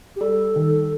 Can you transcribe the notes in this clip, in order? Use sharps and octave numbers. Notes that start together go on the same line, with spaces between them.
G4
G3 A4
D#3